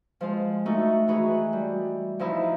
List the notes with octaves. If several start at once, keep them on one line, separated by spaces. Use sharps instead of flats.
F3 G#3 F4
A3 D#4 F#4
E3 F#4 G#4
G3
F3 D#4 E4